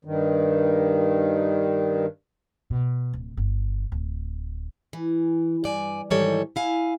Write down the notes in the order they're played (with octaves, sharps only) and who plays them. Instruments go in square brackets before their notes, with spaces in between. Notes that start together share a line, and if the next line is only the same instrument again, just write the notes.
[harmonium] G2 D#3
[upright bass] B2
D1
G1
D1
[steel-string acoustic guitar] E3
G2 D5 G#5
G#2 D#3 E3 G3 A4 C#5
E4 F5 G#5